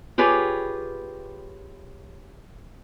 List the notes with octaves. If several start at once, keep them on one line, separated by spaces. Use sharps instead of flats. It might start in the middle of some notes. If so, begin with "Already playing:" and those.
F4 G4 G#4 B4 C#5